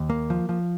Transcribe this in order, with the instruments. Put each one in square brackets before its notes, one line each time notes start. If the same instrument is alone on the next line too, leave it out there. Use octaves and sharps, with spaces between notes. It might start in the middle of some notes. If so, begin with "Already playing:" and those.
Already playing: [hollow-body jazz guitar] D#2
A#3
F3
F3